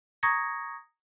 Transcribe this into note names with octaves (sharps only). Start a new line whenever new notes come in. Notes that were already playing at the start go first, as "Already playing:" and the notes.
A#5 C#6 D#6 G#6 A#6 C#7